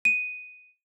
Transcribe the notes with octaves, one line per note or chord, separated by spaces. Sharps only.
D#7